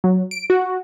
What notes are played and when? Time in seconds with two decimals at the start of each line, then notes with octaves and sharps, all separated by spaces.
0.04 F#3
0.31 D7
0.50 F#4